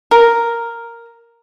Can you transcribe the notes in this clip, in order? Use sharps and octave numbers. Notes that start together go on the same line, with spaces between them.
A#4